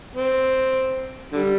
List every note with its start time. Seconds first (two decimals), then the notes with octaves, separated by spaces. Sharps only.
0.16 C4
1.33 D3 G3